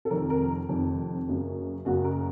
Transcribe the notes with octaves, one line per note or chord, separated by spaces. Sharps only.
A4
F1 F2 D#3 A#4
A#4
F1 F2 D#3
F#1 F#2 C#3
F#1 F#2 C#3 F#4
A#4